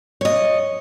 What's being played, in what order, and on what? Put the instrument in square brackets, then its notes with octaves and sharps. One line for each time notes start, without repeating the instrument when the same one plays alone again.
[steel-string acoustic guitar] C#5 D#5